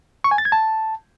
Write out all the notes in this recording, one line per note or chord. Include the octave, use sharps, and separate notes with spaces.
C#6
G#5
A6
G#6
A5